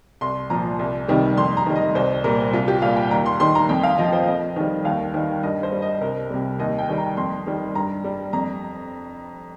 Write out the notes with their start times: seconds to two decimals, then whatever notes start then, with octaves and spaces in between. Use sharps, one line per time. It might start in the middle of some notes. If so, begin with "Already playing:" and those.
0.21 C2 C6
0.50 A#2 F3 A#5
0.79 C2
1.08 C3 D#3 G3
1.37 F2 C6
1.57 A#5
1.66 D#3 G3
1.76 D#5
1.95 C2 C5
2.24 A#2 G3 A#4
2.53 C2 F4
2.68 G4
2.82 A#2 G3 F5
2.96 G5
3.11 D#2 A#5
3.26 C6
3.40 D#3 G3 C6
3.55 A#5
3.69 F2 G5
3.83 F5
3.98 F3 D#5
4.13 C5
4.27 F2 D#5
4.56 D#3 G3
4.85 D#2 F5
5.14 D#3 G3
5.43 G2 D#5
5.63 C5
5.72 G3
5.82 D#5
6.01 C2 A#4
6.30 C3 G3
6.59 D#2 D#5
6.78 G5
6.89 D#3 G3
6.98 A#5
7.17 F2 C6
7.46 D#3 G3
7.75 G2 A#5
8.04 G3
8.33 F2 A#5